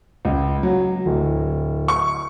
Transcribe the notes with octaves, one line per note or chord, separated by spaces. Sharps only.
C#2
F#3
D1
C#6